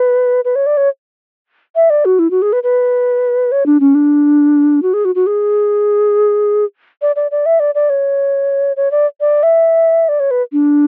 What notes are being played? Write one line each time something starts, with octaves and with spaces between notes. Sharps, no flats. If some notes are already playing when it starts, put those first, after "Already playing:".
Already playing: B4
B4
C#5
D5
C#5
E5
D5
F#4
E4
F#4
G#4
B4
B4
C#5
D4
C#4
D4
F#4
G#4
F#4
F#4
G#4
D5
D5
D5
E5
D5
D5
C#5
C#5
D5
D5
E5
D5
C#5
B4
D4